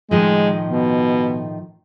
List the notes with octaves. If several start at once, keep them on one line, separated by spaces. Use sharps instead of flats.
A2 D#3 F3 G#3
B2